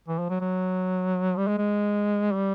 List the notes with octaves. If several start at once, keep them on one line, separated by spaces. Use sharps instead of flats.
E3
F3
F#3
F#3
G3
G#3
G#3
G3